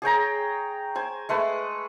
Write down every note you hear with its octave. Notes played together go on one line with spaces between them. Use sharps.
G#4 C#5 G5 A#5
C5 G#5
G#3 A3 B4